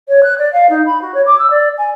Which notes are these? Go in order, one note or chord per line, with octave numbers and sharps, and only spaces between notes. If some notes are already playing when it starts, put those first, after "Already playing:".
C#5
F#6
D5
F5
D#4
B5
F#4
C#5
D6
E6
D5
G#5